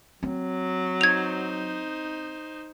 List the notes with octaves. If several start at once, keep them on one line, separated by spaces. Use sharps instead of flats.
F#3 C4
D#4 C5 G#6 F7